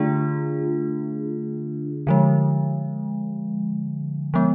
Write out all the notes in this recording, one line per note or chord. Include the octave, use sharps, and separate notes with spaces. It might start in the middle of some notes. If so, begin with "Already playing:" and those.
Already playing: D3 A3 D4 F4 G#4
D3 F3 G#3
F3 G#3 B3